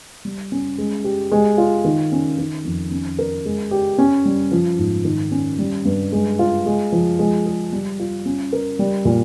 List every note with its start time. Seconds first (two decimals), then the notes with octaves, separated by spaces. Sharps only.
0.25 G3
0.52 C#4
0.78 G#3
1.04 G4
1.32 G#3
1.58 F4
1.84 D#3
2.12 C#4
2.38 D#3
2.65 F2
2.91 C#4
3.18 A#4
3.45 G#3
3.71 G4
3.98 C#4
4.25 G3
4.51 F3
4.79 G#2
5.05 D#3
5.32 C#4
5.59 G3
5.85 G2
6.12 G#3
6.39 F4
6.66 G#3
6.92 F3
7.19 G#3
7.46 G#4
7.72 G3
8.00 F4
8.26 C#4
8.52 A#4
8.79 G3
9.05 A#2